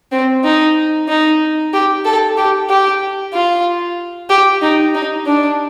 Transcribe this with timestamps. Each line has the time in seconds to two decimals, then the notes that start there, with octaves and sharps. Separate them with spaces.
0.12 C4
0.44 D#4
1.09 D#4
1.73 G4
2.05 A4
2.37 G4
2.69 G4
3.34 F4
4.30 G4
4.62 D#4
4.95 D#4
5.27 D4